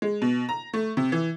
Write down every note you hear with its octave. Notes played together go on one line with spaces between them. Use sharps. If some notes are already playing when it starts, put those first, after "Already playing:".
G#3
B2
A#5
A3
C3
E3